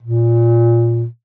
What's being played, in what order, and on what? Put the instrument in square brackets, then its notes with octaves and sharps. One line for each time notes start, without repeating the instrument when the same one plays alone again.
[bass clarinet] A#2